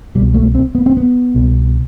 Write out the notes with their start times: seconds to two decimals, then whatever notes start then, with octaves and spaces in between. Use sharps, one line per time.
0.15 C2 B2 G3
0.34 A3
0.55 C4
0.75 B3
0.86 C4
0.97 B3
1.35 C2 B2